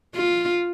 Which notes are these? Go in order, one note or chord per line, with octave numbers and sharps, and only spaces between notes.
F4